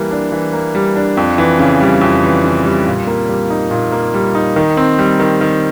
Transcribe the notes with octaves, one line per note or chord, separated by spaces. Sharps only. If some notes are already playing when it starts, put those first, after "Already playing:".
Already playing: E3 G3 A#3
D4
E3
A#3
G3
D4
F2
E3
C#3
G3
F2
E3
C#3
G3
A#2
A#3
G3
D#4
A#2
A#3
G3
D#4
D#3
C4
G3
D#3
D#3